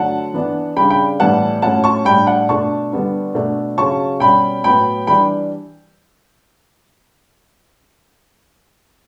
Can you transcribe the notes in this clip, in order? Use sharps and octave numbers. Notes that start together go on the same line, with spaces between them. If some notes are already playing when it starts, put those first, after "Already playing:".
Already playing: D3 F#3 A3 D4 F#5 A5
E3 B3 D4
C#3 G3 D4 G5 B5
G5 B5
A2 E3 G3 B3 F#5 A5
A2 F#3 C#4 F#5 A5
A5 C#6
A2 G3 D4 G5 B5
F#5 A5
B2 A3 D4 A5 C#6
D3 G3 B3 D4
B2 A3 D4
C#3 F#3 C#4 A5 C#6
B2 G3 C#4 G5 B5
A2 F#3 B3 G5 B5
E3 G3 D4 G5 B5